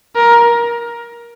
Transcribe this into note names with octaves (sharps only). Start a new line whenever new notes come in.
A#4